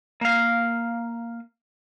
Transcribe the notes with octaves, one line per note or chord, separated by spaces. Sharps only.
A#3 F5